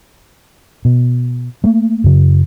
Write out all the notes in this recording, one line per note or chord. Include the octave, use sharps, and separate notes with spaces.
B2
A3 A#3
F#2 C#3